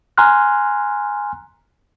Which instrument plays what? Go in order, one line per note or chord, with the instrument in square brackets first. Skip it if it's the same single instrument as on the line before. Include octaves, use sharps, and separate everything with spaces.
[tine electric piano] G#5 A#5 C6 F6 F#6